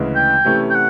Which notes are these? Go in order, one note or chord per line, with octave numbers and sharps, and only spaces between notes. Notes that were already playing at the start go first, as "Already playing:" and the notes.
Already playing: D2 C#3 E3 G#3
G5
C3 E3 A3 C#4 E4
G5
F#5